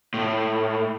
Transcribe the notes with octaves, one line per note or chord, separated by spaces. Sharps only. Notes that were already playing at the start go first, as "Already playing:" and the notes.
A2